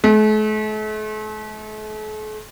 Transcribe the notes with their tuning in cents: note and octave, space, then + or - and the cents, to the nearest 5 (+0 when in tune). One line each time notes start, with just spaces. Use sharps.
A3 -45